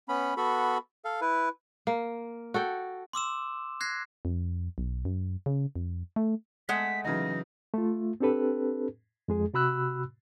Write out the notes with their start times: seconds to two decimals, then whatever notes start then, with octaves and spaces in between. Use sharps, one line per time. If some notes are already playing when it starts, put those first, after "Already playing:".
0.09 B3 C#4 B5
0.37 B3 F#4 A4 B5
1.05 A4 F5
1.21 E4 B4
1.87 A#3
2.54 F#4 A4 G5
3.13 C6 D6 E6 E7
3.81 F#6 G#6 A#6 C7
4.25 F2
4.78 B1
5.05 F#2
5.46 C#3
5.76 F2
6.16 A3
6.69 G#3 A3 F#5 B6
7.05 C#3 E3 F#3 D#4 A#6
7.74 A3 F4
8.20 C4 D4 G4 A4 B4
9.28 F2 G#3 G#4
9.54 C3 F#4 B5 E6 F#6